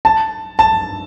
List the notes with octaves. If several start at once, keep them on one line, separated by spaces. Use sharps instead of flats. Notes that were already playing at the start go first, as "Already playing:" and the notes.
A5
A5